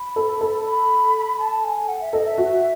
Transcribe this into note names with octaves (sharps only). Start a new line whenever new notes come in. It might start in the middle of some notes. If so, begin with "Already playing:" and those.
Already playing: B5
A4
A4
B5
A5
G#5
F#5
E5
A4 D#5
E5
F#4